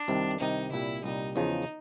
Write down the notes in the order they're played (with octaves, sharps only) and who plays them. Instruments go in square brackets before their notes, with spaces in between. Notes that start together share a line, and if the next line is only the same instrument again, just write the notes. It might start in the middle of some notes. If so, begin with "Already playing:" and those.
Already playing: [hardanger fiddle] D4
[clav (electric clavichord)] C2 C3 D#3
[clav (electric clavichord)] C2 C3 D#3 [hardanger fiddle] D#4
[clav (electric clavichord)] C2 A#2 G3 [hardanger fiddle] E4
[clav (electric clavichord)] C2 A#2 G3 [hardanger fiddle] D#4
[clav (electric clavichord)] E2 C#3 F3 [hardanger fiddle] D#4